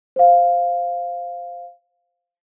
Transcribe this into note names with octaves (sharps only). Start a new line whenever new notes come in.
C5 F5